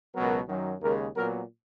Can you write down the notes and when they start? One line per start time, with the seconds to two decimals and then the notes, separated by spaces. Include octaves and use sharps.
0.15 C#2 B2 F#3 B3 A#4
0.48 F#2 D#3 F#3
0.82 D#2 C#3 G#3 A#4
1.16 A#2 F#3 B3 A#4